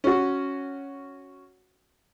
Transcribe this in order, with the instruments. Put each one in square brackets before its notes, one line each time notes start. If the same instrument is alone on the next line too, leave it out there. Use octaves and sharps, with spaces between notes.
[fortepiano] C#4 F#4